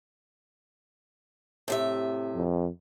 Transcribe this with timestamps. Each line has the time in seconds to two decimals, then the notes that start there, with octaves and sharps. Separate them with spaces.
1.68 A2 C3 E5
2.35 F2